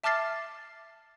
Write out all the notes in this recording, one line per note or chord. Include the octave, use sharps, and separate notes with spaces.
E5 A5 D6 F6 A6 C7